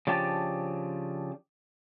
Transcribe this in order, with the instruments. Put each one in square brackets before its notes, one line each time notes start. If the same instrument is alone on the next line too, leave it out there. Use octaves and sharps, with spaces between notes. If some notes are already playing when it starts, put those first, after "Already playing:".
[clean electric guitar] C#3 F3 D4 G4 A5